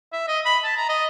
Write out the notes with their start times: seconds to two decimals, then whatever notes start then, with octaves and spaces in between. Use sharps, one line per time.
0.13 E5
0.28 D#5
0.45 B5
0.64 A5
0.77 A#5
0.89 D#5